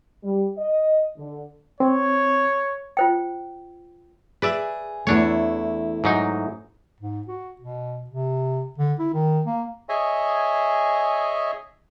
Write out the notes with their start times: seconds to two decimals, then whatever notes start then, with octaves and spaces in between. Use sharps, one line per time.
0.23 G3
0.58 D#5
1.17 D3
1.80 C4 C#5
2.97 F4 C5 G5
4.42 G#4 B4 D5 E5
5.07 E2 A3 D4 E4 C#5
6.04 G#2 F#3 D#4
7.01 G#2
7.27 F#4
7.61 B2
8.10 C3
8.78 D3
8.99 E4
9.13 D#3
9.46 A#3
9.89 G#4 C#5 D#5 E5 G#5